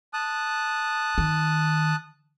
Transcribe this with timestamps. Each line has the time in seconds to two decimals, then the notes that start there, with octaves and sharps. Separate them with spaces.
0.13 A5 D#6 F#6
1.18 D#3